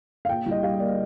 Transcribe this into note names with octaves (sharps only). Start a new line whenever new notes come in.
F5
A#2 G5
C2
D#5
G3 F5
A#3 D5